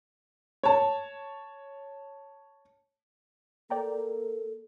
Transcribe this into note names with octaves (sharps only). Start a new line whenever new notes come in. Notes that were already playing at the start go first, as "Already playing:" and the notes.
C#5 A5
A#3 A4 D5 G5 A#5